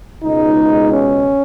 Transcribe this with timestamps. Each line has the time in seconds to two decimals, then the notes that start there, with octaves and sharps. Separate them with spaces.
0.23 C#2 B2 G#3 D#4
0.93 C#4